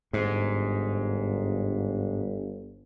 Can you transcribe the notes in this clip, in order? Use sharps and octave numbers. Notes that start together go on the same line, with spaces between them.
G1 G#2